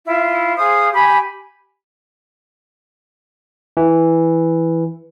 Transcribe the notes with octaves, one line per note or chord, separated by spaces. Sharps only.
E4 F4
G#4 C5 F5 D#6
G4 G#5 B5
E3